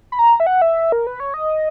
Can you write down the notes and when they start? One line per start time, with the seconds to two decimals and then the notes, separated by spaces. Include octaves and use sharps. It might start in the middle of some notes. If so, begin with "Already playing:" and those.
0.12 B5
0.19 A#5
0.40 E5
0.47 F#5
0.62 E5
0.92 A#4
1.07 B4
1.20 C#5
1.34 D#5